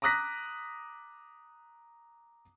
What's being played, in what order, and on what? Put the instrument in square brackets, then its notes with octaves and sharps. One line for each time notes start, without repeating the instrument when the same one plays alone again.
[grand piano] A#5 D6 D#6 F#6 A#6 B6